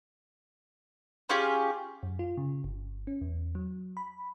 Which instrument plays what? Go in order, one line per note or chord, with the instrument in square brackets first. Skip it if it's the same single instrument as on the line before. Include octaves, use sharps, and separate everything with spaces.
[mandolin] C#4 F4 G4 G#4
[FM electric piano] F#2
F4
C#3
G1
C#4
E2
F#3
B5